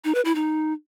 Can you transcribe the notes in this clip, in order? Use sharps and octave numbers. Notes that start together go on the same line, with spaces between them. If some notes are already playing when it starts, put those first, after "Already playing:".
D#4
B4
E4
D#4